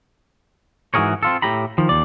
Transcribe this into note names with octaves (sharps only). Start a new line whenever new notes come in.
G#2 E3 F#4 G#4 A#4 C#5
C4 F4 A4
A2 G4 A#5 B5
D#3 F3
D#2 D5